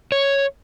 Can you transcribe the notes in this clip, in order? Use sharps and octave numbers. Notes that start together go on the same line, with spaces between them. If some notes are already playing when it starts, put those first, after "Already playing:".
C#5